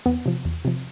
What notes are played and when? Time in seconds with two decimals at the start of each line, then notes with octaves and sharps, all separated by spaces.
0.06 E2 B3
0.26 C3 F3
0.45 E2
0.65 C3 F3